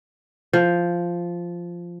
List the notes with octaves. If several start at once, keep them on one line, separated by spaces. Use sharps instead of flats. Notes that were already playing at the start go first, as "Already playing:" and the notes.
F3